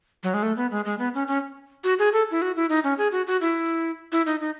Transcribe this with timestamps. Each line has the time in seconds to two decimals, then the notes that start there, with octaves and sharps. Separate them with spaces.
0.23 F#3
0.34 G#3
0.43 A3
0.57 B3
0.71 G#3
0.85 G#3
0.99 B3
1.14 C#4
1.27 C#4
1.84 F#4
1.99 G#4
2.13 A4
2.31 E4
2.42 F#4
2.56 E4
2.70 D#4
2.84 C#4
2.98 G#4
3.12 F#4
3.27 F#4
3.41 E4
4.12 E4
4.26 D#4
4.41 D#4